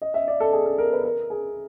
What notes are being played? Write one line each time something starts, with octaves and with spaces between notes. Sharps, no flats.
D#5
E5
D5
A4
G#4
A4
A#4
B4
A#4
G#4